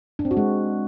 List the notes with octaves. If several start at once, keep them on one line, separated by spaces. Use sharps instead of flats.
D4
C4
F#4
G#3